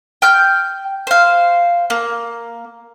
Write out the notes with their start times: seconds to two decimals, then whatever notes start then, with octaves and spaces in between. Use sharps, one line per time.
0.22 G5 F6 G6
1.07 C5 F5
1.90 A#3